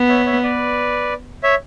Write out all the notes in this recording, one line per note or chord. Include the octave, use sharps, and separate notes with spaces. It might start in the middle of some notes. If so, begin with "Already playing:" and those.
Already playing: B3
C#5 E5
C#5 E5
B4 D5
C#5 E5